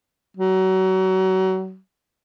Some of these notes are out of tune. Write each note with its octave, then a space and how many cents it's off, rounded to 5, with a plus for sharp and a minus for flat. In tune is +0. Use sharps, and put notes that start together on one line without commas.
F#3 +30